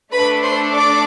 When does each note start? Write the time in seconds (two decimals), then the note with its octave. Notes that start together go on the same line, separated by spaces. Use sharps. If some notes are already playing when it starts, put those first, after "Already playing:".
0.12 A3 D4 A4 B4 B5
0.43 C5 C6
0.73 D5 D6